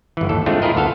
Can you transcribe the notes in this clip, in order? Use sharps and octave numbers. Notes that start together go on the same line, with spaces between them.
G1 E3
D#2 A4
G#3 A3 C4 D4 F4
E4 F4 G#4 A#4 D#5
D2 B3 A4 F5